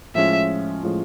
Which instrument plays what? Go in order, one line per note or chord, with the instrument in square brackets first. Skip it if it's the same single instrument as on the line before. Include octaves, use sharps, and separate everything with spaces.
[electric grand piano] A2 F3 G#3 C#4 F4 [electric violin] E5
[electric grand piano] A2 F3 G#3 C#4 F4